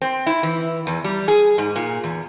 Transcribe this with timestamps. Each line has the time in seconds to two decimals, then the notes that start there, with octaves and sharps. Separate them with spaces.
0.02 C4
0.26 E4
0.43 E3
0.87 E2
1.04 G3
1.28 G#4
1.58 G#2
1.76 A#2
2.04 E2